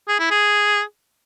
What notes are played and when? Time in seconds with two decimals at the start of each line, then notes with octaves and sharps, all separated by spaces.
0.08 G#4
0.19 E4
0.30 G#4